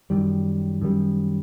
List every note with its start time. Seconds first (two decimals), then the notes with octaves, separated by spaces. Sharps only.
0.10 F#2 D#3 G3
0.82 F#2 D#3 G3